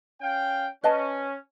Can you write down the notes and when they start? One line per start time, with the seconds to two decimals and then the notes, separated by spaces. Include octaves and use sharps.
0.20 C#4 F5 G5
0.84 C#4 B4 D#5 A5